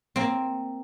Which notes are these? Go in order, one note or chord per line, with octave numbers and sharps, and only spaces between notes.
A#3 C4